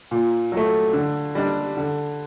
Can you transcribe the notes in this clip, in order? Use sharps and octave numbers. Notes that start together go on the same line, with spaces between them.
A#2
F#3 A3
D3
G3 D4
D3